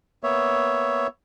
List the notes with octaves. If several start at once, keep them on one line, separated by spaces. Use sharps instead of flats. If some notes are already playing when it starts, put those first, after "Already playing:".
A#3 B3 C#5 E5